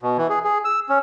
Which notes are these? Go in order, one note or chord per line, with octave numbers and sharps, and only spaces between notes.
B2
E3
G#4
G#4
E6
C#4